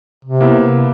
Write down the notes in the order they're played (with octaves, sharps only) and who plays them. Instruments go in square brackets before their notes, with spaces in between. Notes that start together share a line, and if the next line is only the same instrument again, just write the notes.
[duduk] C3
[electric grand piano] A#3 B3 E4